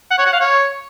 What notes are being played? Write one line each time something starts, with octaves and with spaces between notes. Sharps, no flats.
F#5
C#5
F#5
F5
C#5